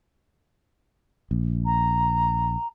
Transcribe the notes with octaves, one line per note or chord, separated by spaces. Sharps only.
A#1
A#5